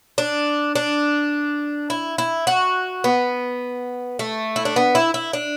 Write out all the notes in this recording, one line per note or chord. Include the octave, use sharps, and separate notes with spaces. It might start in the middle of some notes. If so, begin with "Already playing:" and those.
D4
D4
E4
E4
F#4
B3
A3
E4
D4
B3
E4
E4
D4